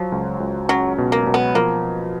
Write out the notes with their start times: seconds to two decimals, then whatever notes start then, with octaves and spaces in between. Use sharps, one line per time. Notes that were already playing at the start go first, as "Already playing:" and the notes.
Already playing: F3 F#3
0.12 C#2
0.40 C#2
0.69 F#3 C#4
0.98 B2
1.12 A#3
1.26 B2
1.34 B3
1.55 F3 A#3